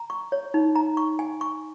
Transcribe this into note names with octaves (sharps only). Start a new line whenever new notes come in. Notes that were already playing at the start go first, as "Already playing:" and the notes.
Already playing: A#5
C#6
C#5
D#4
A#5
C#6
G#5
C#6